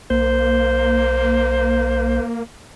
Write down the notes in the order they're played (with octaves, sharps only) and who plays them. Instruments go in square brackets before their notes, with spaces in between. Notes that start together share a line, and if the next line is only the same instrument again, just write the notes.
[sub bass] B1 [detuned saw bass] A#3 [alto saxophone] C5